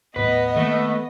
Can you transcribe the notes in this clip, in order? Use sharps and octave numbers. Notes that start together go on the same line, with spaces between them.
D#2 A2 B3 B4 D#5
D#3 A3 A#3